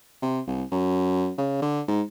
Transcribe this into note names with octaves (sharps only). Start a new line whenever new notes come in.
C3
C2
F#2
C#3
D3
G#2